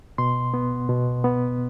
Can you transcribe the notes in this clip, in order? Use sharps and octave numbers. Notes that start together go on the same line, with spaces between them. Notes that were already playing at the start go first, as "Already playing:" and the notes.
B2 C6
B3
B2
B3